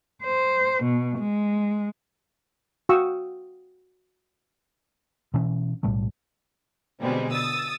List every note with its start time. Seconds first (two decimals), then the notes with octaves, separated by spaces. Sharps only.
0.23 C5
0.83 B2
1.19 G#3
2.89 F#4 F5 G5 C#6 D#6 E6
5.34 B2 E3 C#4
5.83 B1 A2 G3 A3
7.01 B2 D3 G3 G#3 C4
7.32 D#6 E6 A6